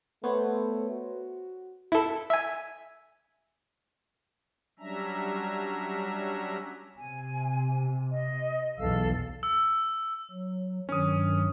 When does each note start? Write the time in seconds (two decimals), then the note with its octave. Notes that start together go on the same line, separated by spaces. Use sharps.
0.24 A3 B3 C5 C#5
0.91 F#4
1.92 E4 A4
2.30 E5 G#5
4.79 F#3 G3 C#4 D4 E5 A#5
6.96 C3 G#5
8.10 D#5
8.78 B1 E2 A4 F5 E6
9.43 E6
10.31 F#3
10.89 G2 D#3 F#3 C#4 D#6